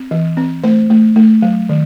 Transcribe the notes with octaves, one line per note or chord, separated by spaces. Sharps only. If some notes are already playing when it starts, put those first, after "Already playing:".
Already playing: C4
E3
C4
A3 C5
A3
A3
F#3
D#3